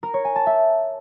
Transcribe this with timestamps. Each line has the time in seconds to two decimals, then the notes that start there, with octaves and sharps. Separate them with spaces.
0.03 A#4
0.14 C#5
0.25 G#5
0.36 A5
0.47 E5